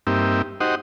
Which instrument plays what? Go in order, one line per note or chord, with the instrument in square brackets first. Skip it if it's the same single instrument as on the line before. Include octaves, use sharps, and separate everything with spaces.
[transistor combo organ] G2 A#3 C4 D#4 G4 E5
D#4 F#4 G4 C5 D#5 F#5